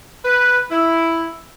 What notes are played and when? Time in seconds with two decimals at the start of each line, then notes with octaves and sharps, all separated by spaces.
0.25 B4
0.71 E4